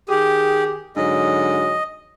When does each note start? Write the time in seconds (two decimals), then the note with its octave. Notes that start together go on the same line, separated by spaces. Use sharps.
0.09 D#3 G4 G#4
0.96 G#2 D3 F#3 D#5